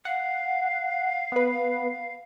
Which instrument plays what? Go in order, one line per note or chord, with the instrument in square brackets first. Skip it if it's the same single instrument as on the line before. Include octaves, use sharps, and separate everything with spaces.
[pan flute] F5 [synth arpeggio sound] F#5
[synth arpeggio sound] B3 B4